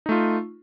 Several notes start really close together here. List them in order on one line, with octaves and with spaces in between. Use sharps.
D#4 A3 F4